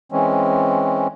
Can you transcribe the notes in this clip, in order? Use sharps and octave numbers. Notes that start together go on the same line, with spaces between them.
E3 G#3 C4 C#4